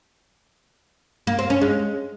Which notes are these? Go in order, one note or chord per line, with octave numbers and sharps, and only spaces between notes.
A#3
C4
C#4
G#3